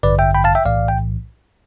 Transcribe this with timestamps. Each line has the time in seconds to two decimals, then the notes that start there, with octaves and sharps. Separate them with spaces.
0.03 A1 G2 D3 B4 D5
0.19 E5 G5
0.35 G5 B5
0.44 F5 A5
0.55 E5 G5
0.65 B1 A2 E3 D5 F5
0.88 G5